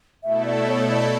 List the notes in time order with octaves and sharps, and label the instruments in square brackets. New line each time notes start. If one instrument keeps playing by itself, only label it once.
[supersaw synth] B2 A3 E4 A4 [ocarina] E5
[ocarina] D5
C#5
D5